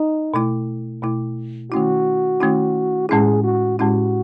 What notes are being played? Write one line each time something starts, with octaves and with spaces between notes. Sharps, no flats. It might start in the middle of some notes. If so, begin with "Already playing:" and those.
Already playing: D#4
B2 A3 E4
B2 A3 E4
D#3 A3 C#4 E4 F#4
D#3 A3 C#4 E4
A2 G#3 C#4 E4 G#4
F#4
A2 G#3 C#4 E4 F#4